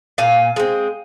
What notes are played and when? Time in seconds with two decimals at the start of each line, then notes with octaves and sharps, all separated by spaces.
0.18 A#2 F5 G#5
0.56 G#3 C4